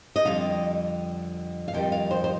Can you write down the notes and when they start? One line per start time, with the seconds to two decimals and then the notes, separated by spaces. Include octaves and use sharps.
0.16 D#5
0.25 F2 D3 G3 F5
1.68 F5
1.74 F2 D#3 G3 G5
1.92 F5
2.11 C5
2.24 C5